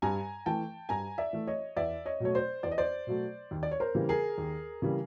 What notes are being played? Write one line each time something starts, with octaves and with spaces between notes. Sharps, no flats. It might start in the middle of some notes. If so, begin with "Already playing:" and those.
G2 G#5 A#5
E3 A3 G5 A5
G2 G#5 A#5
D5 E5
E3 A3
C#5 D#5
E2 D5 E5
C#5 D#5
B2 F#3 A3 C#5
C5 D5
E2 D5
D#5
C5 D5
B2 F#3 A3
D#2
D5
C#5
A#4 C5
C#3 E3 G3 A#3
G#4 A#4
D#2
C#3 E3 G3 A#3